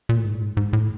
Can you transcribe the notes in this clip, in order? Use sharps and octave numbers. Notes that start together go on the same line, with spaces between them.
A#2
A2
G#2
A2
G#2
G#2
A2